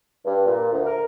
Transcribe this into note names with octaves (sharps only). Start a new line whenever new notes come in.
G2
A#2
D2
A#4